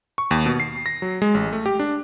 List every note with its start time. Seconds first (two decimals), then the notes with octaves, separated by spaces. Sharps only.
0.18 C#6
0.31 D#2
0.46 B2
0.60 C7
0.86 A#6
1.02 F#3
1.22 G#3
1.34 A1
1.53 A3
1.66 G4
1.80 D4